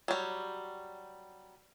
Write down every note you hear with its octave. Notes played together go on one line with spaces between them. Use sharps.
F#3 G3